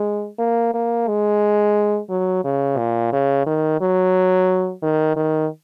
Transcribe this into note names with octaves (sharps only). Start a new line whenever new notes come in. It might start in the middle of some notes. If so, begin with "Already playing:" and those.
Already playing: G#3
A#3
A#3
G#3
F#3
C#3
A#2
C#3
D#3
F#3
D#3
D#3